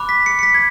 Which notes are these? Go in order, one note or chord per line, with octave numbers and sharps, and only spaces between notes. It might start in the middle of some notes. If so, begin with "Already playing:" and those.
Already playing: B5 D6 F#6
B6
C#7
C#7
B6
G#6